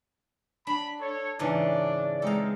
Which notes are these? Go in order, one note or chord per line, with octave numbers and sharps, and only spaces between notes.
D4 B5
A4 C#5
G#2 C#3 E3 D4 D5
G#3 C4 D#4 A4 F5